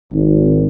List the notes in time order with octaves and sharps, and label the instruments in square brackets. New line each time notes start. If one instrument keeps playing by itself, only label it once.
[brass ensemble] G#1